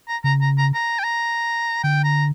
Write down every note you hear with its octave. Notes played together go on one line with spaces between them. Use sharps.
A#5
C#3 A#5
A#5
A#5
A#5
G5
A#5
D3 G5
A#5